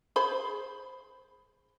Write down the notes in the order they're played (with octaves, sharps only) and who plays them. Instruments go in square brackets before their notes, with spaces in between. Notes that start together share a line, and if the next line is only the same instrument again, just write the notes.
[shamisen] G#4 C5 B5